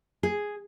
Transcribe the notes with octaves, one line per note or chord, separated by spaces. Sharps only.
G#4